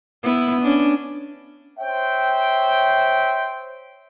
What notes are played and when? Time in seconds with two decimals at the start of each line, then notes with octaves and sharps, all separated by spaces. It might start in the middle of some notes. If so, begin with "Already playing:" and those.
0.24 B3 E4
0.61 C#4 D4
1.80 C5 C#5 E5 G5